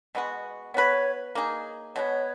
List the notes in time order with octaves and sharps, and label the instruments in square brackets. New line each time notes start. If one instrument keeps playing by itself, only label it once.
[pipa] B2 G#3 B3 F#4
[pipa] B3 F#4 B4 [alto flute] C#5
[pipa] A#3 D#4 G#4
[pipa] B2 G#3 B3 [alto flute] C#5